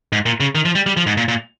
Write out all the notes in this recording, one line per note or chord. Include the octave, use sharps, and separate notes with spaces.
G#2
A#2
C#3
D#3
F3
G3
G3
F3
G#2
A#2
A#2